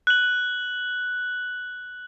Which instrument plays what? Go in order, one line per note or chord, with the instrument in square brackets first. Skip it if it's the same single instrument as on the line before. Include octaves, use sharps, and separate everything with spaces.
[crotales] F#6 F#7